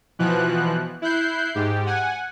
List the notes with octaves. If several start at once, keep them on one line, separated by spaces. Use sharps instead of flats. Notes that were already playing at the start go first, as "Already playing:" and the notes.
B2 E3 F3 F#6
E4 F#6 G6 C7
G#2 G4
F#5 G#5